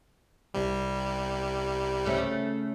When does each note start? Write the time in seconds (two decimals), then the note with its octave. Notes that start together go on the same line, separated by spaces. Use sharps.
0.54 C2 C3 G3
2.05 C#3 A3 C#4